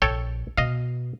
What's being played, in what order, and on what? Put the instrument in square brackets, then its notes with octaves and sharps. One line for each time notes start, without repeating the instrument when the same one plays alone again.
[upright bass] A#1 [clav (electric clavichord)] A4 C#5 G5
[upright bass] B2 [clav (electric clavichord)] D#5 F5